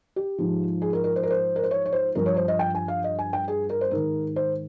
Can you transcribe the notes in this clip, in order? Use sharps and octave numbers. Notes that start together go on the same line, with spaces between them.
G4
G#2 F3
G#4
A#4
A#4
C5
A#4
C5
A#4
C5
C#5
C#5
C5
G2 F3 A#4
C#5
C5
D#5
G5
G#5
F5
D#5
G#5
G5
G#4
A#4
C5
G#2 D#3 A#4
C5